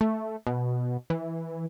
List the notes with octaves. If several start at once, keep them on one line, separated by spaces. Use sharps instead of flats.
A3
B2
E3